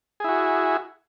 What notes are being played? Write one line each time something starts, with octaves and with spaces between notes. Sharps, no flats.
E4 F#4 G#4